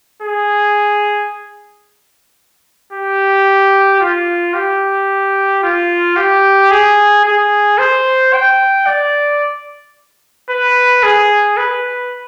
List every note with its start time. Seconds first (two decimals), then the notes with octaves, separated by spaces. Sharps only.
0.22 G#4
2.93 G4
4.01 F4
4.54 G4
5.63 F4
6.16 G4
6.71 G#4
7.25 G#4
7.78 C5
8.33 G5
8.86 D5
10.50 B4
11.03 G#4
11.57 B4